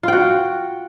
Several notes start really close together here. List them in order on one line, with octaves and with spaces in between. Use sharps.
F4 G5 F#4